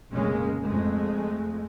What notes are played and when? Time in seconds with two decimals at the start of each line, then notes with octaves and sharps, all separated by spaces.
0.12 F1 A#1 C#3 G#3 A#3 C#4
0.65 F2 G#3 A3